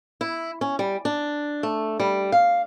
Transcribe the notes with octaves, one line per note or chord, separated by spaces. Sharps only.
E4
C#4
G3
D4
A3
G3
F5